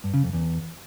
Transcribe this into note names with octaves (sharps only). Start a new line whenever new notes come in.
G2
C#3
F2
E2